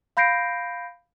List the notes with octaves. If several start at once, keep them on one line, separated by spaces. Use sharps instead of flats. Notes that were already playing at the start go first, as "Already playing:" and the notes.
F5 B5 G6 A#6 C7 D7